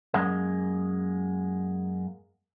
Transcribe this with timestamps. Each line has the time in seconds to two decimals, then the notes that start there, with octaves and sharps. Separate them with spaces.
0.14 F#2 G#3 A#3